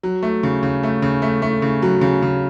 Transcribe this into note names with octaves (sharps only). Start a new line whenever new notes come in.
F#3
A3
C#3
C#3
A3
C#3
A3
A3
C#3
F#3
C#3
C#3